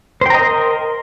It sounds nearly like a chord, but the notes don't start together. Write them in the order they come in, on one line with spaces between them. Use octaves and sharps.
C5 G5 A#5 D#5 A#4